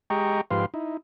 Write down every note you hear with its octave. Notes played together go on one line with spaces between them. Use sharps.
G#3 G4 D#5 G5 A#5 C#6
G#2 F3 G4 B4 F5 C6
D#4 E4